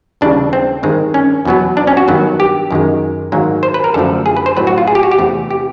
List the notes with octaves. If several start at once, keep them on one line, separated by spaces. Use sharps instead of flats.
D#2 C#3 E3 G3 D4
C4
G2 D#3 G#3 C4
C#4
E2 B2 F#3 B3
D4
C#4
F#4
G2 D#3 F#3 B3
G4
F#2 D#3 G#3
G#2 D#3 F#3 A#3
C5
B4
A#4
F#2 D3 F3 A3 A4
G#4
B4
C5
A2 F#3 A3 C4 B4
F#4
F4
G#4
G4
F#4
G4
E2 C3 E3 A3 C4
G4